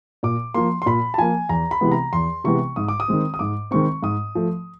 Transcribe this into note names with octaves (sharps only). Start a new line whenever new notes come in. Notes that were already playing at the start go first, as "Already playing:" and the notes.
A#2 D6
F3 A#3 C6
C6
A#2 B5
A5
F3 A#3 G#5
E2 A#5
B5
C3 E3 G#3 B3
A#5
E2 C6
C3 E3 G#3 B3 C#6
G#2 D#6
D6
D#6
D#3 G#3 C4
D#6
G#2 D6
D#3 G#3 C4 C#6
G#2 D#6
F3 A3